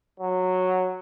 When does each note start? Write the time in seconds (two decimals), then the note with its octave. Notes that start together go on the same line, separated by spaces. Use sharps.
0.20 F#3